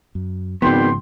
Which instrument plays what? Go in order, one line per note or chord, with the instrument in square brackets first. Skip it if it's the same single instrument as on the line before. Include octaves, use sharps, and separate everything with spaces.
[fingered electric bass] F#2
[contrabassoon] G#1 [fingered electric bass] G#2 C#3 F3 [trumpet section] G3 G5 C6 [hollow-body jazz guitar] B3